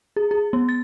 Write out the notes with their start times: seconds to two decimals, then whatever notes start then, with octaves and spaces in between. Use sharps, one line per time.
0.16 G#4
0.31 G#4
0.53 B3
0.69 A6